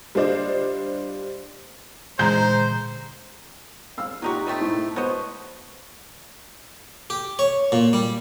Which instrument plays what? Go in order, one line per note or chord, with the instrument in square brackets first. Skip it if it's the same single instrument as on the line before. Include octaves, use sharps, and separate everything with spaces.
[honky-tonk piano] G3 D4 F4 C5 D5 D#5
[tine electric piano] A#2 D3 E3 [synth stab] G#3 [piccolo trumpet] C5 [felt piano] A#5 G6
[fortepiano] F5 E6
[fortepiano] A#2 G4 [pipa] F#3 D#4 F#4
[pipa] A3 C4 D#4
[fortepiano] A2 E4
[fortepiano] B3 C5 [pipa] F#4 C#5 D#5
[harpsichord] G4
C#5
A#2
G3